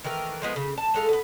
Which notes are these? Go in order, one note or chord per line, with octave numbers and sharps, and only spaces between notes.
D#3 E3 A3 A#4
F3 G#3 B3
C#3
A5
G#3 A4 F5
B3 B4